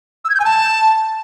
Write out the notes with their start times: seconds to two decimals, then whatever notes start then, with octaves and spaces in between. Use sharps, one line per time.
0.25 E6
0.30 G#6
0.35 G6
0.40 G#5
0.45 A5